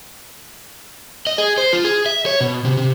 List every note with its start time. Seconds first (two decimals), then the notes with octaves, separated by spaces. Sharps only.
1.27 D#5
1.38 G#4
1.58 C5
1.73 F4
1.84 G#4
2.06 E5
2.26 C#5
2.41 B2
2.65 C3
2.77 C3